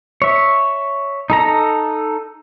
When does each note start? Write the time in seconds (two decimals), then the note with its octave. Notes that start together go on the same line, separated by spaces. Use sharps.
0.22 C#5 E5
1.30 D#4 A4 A#5